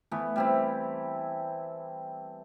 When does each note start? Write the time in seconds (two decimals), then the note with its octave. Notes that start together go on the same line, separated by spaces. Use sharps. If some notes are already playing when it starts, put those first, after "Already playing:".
0.11 E3 A3 B3
0.36 G3 C4 E4